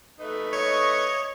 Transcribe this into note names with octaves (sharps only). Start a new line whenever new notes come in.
A3 D#4 B4
C#5 D#5 C#6